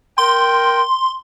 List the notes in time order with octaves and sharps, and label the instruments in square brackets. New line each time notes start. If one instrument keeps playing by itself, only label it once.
[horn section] A#4 G5 [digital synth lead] C6